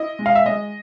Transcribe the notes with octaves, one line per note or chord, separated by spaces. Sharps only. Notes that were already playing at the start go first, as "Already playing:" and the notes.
Already playing: E4 D#5
G#3
F5
E5
G#3 D#5